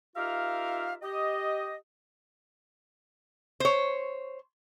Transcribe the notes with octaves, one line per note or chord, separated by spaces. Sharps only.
D#4 F4 G4 A#4 E5 F5
G4 D#5
C5 C#5